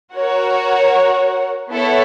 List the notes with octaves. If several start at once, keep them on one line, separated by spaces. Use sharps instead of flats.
F#4 A#4 C#5 F#5
B3 E4 A4 C#5